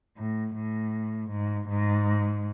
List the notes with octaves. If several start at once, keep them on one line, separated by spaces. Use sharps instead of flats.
A2
A2
G#2
G#2